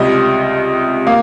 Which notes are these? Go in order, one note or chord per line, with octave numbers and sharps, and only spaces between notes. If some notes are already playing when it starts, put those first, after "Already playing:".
Already playing: C#2 C3 G3 D#5
A#3 F5